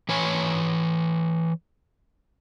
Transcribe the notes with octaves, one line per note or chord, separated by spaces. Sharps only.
E3 B4 C#5 G#5